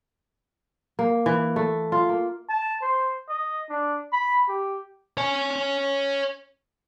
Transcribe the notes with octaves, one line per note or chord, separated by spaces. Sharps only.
A#3
E3
A3
F4
A#3
A5
C5
D#5
D4
B5
G4
C#5 G#5